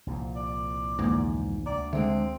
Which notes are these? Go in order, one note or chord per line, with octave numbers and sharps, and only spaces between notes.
C2 A#2 F3
D5
E2 G#2 D3 G#3 A#3
D2 D5 A#5
D3 G#3 C4 E5